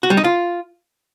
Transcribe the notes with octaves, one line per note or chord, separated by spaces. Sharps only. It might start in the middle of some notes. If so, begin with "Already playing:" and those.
F#4
G3
D#4
F4